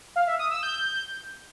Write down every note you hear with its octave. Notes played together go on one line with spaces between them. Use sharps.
F5
E5
D#6
E6
G6